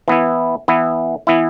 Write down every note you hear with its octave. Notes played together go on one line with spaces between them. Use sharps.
E3 B3 E4
E3 B3 E4
E3 B3 E4